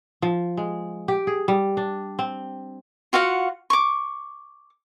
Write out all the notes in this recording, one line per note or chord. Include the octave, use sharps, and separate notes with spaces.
F3
G#3
G4
G#4
G3
D4
C4
F4 F#4 F5 F#5
C#6 D6